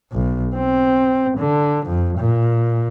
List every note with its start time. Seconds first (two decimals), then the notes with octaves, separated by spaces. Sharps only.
0.12 B1
0.56 C4
1.38 D3
1.87 F2
2.19 A#2